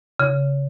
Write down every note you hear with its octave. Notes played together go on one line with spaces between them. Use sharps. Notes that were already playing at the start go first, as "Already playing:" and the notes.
C#3